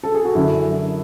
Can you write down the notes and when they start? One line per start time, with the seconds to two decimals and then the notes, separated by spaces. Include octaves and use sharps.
0.03 A4
0.14 G#4
0.25 F#4
0.35 F#2 D3 E4